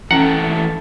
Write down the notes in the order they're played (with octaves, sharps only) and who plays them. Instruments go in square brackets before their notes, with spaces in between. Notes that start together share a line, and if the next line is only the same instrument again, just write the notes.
[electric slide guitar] E3 A3 G5 [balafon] C#4 [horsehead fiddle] A4 [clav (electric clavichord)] F#5